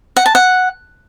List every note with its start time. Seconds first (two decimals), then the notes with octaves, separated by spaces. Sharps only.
0.17 F#5
0.26 A5
0.35 F#5